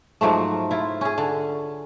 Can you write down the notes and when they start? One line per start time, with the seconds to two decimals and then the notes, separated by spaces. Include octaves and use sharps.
0.21 G#2 F3 F#3 A3
0.71 E4 F4
1.01 C#4 G#4
1.18 D3